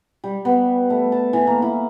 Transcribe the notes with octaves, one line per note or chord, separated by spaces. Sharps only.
G3
B3
A3
A5
E3
A#3
E4